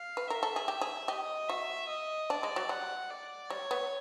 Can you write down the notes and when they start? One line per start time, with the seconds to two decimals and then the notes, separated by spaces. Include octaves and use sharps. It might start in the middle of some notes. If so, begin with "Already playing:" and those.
Already playing: F5
0.17 B4
0.28 A#4 E5
0.43 A4
0.56 G#4
0.68 G4
0.81 G#4
1.08 G4 D#5
1.48 F#4 E5
1.89 D#5
2.30 D4 D5
2.43 G#3
2.56 F#3
2.69 G3 F#5
3.10 D5
3.50 G3 C#5
3.71 B3